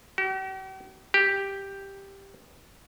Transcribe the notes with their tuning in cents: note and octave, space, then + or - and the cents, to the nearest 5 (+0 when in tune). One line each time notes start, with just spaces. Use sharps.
G4 -45
G4 +5